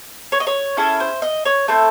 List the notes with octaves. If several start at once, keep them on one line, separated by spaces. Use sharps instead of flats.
C#5
D#5
C#5
C#4 E4 G#4 A4
C5
D#5
C#5
A3 C4 E4 A4